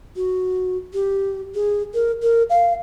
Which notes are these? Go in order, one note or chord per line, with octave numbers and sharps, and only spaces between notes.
F#4
G4
G#4
A#4
A#4
F5